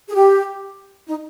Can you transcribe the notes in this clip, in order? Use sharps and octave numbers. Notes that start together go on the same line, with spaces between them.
G#4
G4
D#4